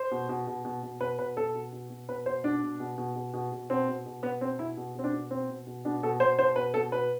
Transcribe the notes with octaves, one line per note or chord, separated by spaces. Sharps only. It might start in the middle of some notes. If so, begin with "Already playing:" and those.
Already playing: C5
B2
B2
B2
B2
B2
B2 B4
B2 B4
B2 A4
B2
B2
B2
B2 B4
B2 C5
B2 D4
B2
B2
B2
B2
B2
B2
B2 C4
B2
B2
B2 B3
B2 C4
B2 E4
B2
B2 C4
D4
B2
B2 C4
B2
B2
B2 D4
B2 A4
B2 C5
B2 C5
B2 B4
B2 A4
B2 B4